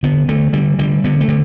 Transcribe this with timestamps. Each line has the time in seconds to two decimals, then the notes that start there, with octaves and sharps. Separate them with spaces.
0.03 D3 B3
0.28 D3 A3
0.53 D3 G3
0.79 D3 G3
1.04 D3 B3
1.20 A3
1.28 D3